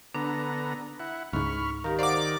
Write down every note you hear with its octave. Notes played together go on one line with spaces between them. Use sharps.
D3 B3 D4 A#5
E4 F#5
C#2 G#2 B5 C#6 F6
D#3 G4 A#4 F5
C5 D5 F5 F#5 D6